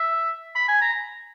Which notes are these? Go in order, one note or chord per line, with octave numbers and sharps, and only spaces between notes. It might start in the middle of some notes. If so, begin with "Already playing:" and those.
Already playing: E5
B5
G#5
A#5